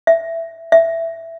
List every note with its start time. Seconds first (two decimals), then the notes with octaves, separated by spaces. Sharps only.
0.07 E5
0.72 E5